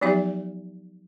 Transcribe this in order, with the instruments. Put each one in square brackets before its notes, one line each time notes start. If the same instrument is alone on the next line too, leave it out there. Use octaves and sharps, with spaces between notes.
[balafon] F3 F#3 B3 D#4 G4 E5